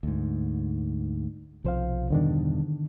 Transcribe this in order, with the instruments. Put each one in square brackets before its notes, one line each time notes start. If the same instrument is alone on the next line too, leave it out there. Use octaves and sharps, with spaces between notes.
[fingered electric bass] D2 G#2
[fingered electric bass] B1 F3 [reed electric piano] C3 C5 F5
[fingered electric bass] E2 G2 B2 [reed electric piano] D3 D#3 D4